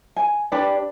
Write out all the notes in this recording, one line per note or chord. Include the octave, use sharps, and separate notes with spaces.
G#5
D4 G4 B4 D5